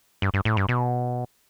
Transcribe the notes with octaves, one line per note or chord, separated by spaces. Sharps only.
G2
G2
A2
G2
B2